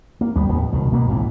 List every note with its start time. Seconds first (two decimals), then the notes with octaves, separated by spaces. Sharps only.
0.21 A#3
0.36 D2 G3 B3
0.49 D1 D#2 F3 B3
0.72 E1 C2 B2 D#3
0.92 B2 A#3 B3
1.08 G#1 C#2 G#2 E3